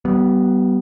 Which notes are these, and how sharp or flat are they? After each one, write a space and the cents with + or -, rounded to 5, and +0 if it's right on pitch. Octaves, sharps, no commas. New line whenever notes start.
G3 -35 B3 +0